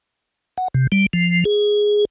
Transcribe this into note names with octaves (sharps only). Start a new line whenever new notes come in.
F#5
C3
G3
F3
G#4